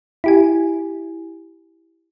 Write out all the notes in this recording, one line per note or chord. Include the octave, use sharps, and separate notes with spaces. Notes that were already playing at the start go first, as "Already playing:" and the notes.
E4 G4 G#5